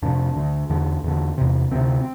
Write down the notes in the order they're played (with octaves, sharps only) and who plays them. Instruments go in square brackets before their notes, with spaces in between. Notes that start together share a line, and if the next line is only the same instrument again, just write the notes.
[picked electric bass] F2 C3 D4
D2 D3
E2 D3
E2 D3
E2 C3
D2 C3 C4